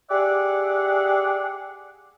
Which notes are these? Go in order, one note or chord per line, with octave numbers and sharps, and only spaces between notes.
G4 G#4 D5 E5 F#5